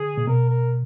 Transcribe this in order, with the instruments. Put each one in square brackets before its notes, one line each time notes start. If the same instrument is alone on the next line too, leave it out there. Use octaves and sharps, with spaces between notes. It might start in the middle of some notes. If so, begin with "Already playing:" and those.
Already playing: [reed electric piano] D3 [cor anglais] G#4
[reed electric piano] A#2
[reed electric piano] B2 [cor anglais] A#4
[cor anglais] A#4